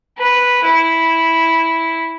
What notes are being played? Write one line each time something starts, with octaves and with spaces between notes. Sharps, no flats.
B4
E4